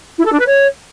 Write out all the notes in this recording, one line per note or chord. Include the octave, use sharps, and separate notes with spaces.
E4
A4
D4
B4
C#5